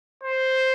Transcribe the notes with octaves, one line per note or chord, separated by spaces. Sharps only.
C5